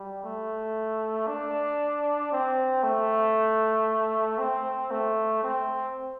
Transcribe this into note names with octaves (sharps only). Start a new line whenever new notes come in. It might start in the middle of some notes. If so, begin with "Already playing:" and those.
Already playing: G3
A3
D4
C4
A3
C4
A3
C4